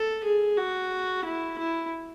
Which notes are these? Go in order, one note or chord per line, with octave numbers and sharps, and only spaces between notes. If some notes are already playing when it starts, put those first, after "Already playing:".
Already playing: A4
G#4
F#4
E4
E4